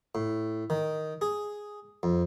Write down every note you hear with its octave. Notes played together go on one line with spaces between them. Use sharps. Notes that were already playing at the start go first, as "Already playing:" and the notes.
A2
D#3
G#4
F2